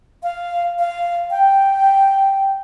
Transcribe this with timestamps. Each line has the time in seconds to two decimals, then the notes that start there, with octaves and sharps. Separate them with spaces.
0.23 F5
0.79 F5
1.31 G5